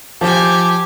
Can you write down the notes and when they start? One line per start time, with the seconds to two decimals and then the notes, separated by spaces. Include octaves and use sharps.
0.21 F3 G4 G#5